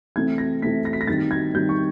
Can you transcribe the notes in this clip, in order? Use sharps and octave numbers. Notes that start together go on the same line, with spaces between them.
C3 E3 A3 C4 G#6
A#6
C3 E3 A3 C4 B6
A#6
B6
A#6
D#3 G3 C4 A6
G#6
D#3 G3 C4 G6
C#6